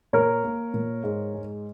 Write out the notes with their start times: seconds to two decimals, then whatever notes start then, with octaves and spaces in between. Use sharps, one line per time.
0.13 A#2 A#4 C#5
0.44 A#3
0.74 A#2
1.04 G#2
1.34 G#3